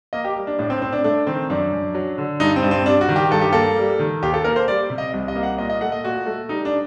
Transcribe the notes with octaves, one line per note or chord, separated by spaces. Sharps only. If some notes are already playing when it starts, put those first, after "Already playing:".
A#3 D#5
G4
G3
D4
A2 D4
C4
A2 C4
D4
A3 D4
D#3 C4
F#2 D4
F#2
F#3
D3
G2 D#4
C4
G2
C4
G3 D4
F#4
D#3
G4
G2 A4
G4
A#3 A4
G3
D#3
D#2 G4
A4
A#3 A#4
C5
G3 D5
C3
D#5
C2
D#5
A#3
F#5
A#2 D#5
D#5
A3 F#5
D#5
A#2 F#4
A3
G3 D#4
D4